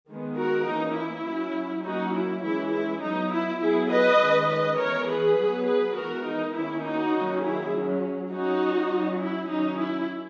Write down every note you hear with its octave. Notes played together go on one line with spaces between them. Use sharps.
D#3 G#3 B3
F#4 A#4
E3 A#3 C#4 D#4
E4
F#3 C#4
F#3 A#3 C#4 D#4 F#4
E4
E3 G#3 C#4 E4
E4
F#3 B3 D#4
E4
F#3 B3 E4 G#4
B4 D#5
D#3 G#3 C#4
B4 D#5
E3 B3 A#4 C#5
G#4 B4
F#3 B3
G#4 B4
E3 G#3 B3 F#4 A#4
D#4
D#3 A#3 C#4 E4
D#4 F#4
D#3 F#3 A#3 C#4
E4 G#4
F#3 C#4
F#3 C#4 D#4 F#4
F#3 C#4
E4
D#3 F#3 C#4 D#4
E4